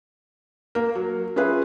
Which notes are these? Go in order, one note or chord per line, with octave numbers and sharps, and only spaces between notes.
A#3 A#4
F#3
C#4 F4 G#4 B4 E5